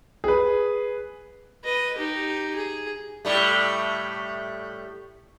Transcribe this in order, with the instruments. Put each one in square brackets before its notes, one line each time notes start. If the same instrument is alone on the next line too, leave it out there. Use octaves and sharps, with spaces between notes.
[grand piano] G#4 B4
[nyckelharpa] B4 D#5
D#4 G4
G#4
[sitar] A2 G3 A3